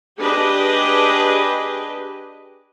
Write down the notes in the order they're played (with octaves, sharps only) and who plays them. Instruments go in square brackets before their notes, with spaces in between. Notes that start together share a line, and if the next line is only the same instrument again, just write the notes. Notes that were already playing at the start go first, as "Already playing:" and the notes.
[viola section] D4 G4 G#4 B4 D#5